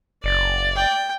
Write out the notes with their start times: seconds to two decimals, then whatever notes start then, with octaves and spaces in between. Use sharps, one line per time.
0.24 F#1 D5
0.76 G5